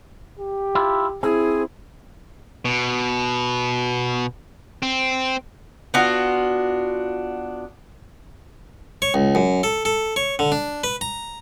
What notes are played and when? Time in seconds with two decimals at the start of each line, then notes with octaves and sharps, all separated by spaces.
0.39 G4
0.75 E4 F4
1.23 C4 E4 G#4
2.65 B2
4.83 C4
5.94 B3 D4 F4 F#4
9.02 C#5
9.14 C#2
9.35 F#2
9.63 A4
9.85 A4
10.16 C#5
10.39 D3
10.52 D4
10.84 B4
11.01 A#5